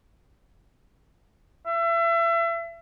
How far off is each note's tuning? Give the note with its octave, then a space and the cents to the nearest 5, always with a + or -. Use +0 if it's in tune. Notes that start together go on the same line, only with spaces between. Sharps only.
E5 +30